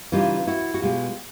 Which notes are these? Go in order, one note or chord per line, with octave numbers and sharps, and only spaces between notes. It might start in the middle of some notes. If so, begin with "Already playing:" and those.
C#3 E3 G3 D#4 F4
E4 F#4
F#4
B2 G#3 B3 F4 G4